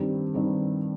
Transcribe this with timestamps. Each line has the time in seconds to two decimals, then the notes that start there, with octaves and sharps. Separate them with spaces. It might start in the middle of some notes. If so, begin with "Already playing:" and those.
Already playing: G2 D#3 G3 C4
0.34 G2 D#3 G3 C4